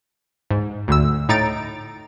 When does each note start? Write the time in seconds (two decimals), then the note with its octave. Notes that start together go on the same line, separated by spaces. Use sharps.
0.51 G#2
0.88 D2 D3 E6
1.29 A2 D#4 A#5 A6 D7